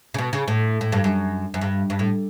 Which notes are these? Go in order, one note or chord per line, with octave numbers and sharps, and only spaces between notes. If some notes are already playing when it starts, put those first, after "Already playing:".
C#3
B2
C#3
A2
A2
G2
F#2
F#2
G2
G2
A2